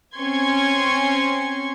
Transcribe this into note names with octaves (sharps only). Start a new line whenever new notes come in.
C4 C#4 C6 C#6 G#6